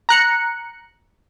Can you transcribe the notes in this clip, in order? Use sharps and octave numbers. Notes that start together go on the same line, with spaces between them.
A#5 F#6 C#7